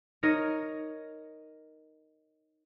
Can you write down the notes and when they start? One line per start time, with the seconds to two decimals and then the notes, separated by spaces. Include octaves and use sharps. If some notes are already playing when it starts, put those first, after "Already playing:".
0.23 D#4 A#4 C#5 D#5